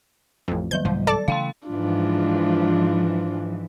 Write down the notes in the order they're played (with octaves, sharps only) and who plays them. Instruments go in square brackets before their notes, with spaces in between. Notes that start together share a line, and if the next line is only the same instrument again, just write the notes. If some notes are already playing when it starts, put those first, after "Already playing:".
[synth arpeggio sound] A1 F2
[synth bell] D#3 F#3 G3 [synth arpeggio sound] G6
[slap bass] C2 G#2 [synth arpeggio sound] F3
[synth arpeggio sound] A4 D5 A5 [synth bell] A6
[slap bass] C#3 E3 A3 [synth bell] F5 G5 C6
[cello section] G#2 E3 F3 [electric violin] D4 F4